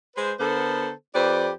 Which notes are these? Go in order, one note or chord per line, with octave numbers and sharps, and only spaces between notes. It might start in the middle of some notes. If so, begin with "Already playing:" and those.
G#3 B4 C5
D3 B3 A4 A#4 C5
F2 G4 B4 C5 D5